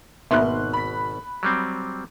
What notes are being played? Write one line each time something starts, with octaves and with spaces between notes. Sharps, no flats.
G#1 B2 A#3 B3 D#4 E5 C6 F#6
B5 B6
F#3 G3 C4